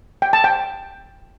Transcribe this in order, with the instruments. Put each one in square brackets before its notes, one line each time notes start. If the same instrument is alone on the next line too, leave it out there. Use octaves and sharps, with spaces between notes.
[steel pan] G5
A5
G5